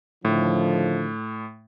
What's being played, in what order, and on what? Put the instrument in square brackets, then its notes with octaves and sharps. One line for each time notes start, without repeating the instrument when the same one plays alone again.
[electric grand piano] A2 [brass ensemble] D3 D#3 F3